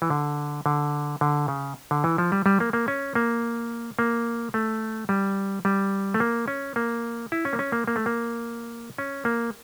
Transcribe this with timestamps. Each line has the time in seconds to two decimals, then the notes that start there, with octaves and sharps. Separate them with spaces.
0.02 E3
0.10 D3
0.66 D3
1.21 D3
1.48 C#3
1.91 D3
2.04 E3
2.18 F3
2.32 G3
2.46 G3
2.60 A#3
2.73 A#3
2.88 C#4
3.15 A#3
3.99 A#3
4.54 A3
5.09 G3
5.65 G3
6.14 A3
6.20 A#3
6.48 C#4
6.76 A#3
7.32 E4
7.45 C#4
7.53 A#3
7.59 C#4
7.72 A#3
7.87 A#3
7.96 A3
8.06 A#3
8.98 C#4
9.25 A#3